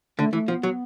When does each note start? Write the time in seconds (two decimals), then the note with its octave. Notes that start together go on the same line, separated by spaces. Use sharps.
0.18 D3 A3
0.33 E3 A3
0.48 F3 B3
0.63 F#3